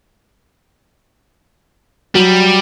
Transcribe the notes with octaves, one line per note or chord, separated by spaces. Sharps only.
F#3 G3